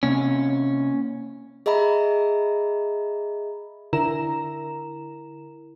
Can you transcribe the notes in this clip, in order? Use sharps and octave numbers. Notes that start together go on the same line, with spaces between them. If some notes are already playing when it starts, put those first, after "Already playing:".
C3 A#3 C4 C#4
G#4 D#5 E5 A#5 B5
D3 E4 A#4 A#5 E7